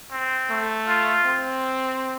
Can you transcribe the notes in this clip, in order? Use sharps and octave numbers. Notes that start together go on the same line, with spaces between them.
C4
A3
F4
C4